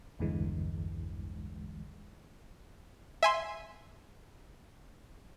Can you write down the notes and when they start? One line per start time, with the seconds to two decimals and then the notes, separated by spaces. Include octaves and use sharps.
0.19 A#1 E2 G2 D3 E3 G#3
3.23 E5 G#5 C6